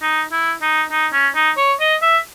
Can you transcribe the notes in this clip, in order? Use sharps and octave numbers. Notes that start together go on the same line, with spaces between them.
D#4
E4
D#4
D#4
C#4
D#4
C#5
D#5
E5